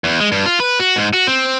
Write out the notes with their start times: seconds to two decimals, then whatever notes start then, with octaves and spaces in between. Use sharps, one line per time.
0.04 E2
0.21 G#3
0.32 G2
0.46 F4
0.60 B4
0.80 F#4
0.96 G#2
1.13 F#4
1.27 C4